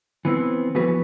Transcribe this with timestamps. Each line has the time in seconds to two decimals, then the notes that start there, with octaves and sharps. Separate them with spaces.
0.25 E3 B3 C4
0.75 E3 F3 B3 F#4 G#4 B4